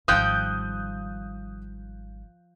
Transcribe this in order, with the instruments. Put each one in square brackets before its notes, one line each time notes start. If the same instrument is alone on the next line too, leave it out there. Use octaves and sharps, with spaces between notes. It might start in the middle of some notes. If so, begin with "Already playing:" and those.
[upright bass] G#1 G3 [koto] F3 F4 G5 [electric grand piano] D#6 F#6 G6